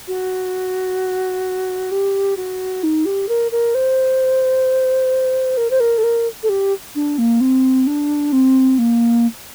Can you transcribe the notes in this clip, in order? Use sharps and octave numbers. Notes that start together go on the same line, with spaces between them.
F#4
G4
F#4
D#4
G4
A#4
A#4
C5
A#4
C5
A#4
A4
A#4
A4
G4
D4
A#3
C4
D4
C4
A#3